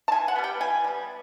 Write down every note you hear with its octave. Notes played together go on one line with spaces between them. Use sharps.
A5
E3 G#5
F#5
G3 B3
G5
E3 G#5
G3 B3